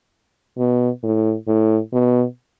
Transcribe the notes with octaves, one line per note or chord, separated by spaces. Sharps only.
B2
A2
A2
B2